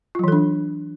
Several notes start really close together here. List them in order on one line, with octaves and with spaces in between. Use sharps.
F4 F#3 E3 A4 D4